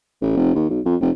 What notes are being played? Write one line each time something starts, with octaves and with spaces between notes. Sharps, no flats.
A1
F1
D#2
B1
F2
F1